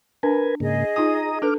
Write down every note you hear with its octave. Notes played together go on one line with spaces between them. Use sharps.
D4 A#4 B4 G#5
G#2 C#3 A#3 G#4 D#5
D#4 F4 G#5 A#5 D#6
D4 A4 B4 D6 F6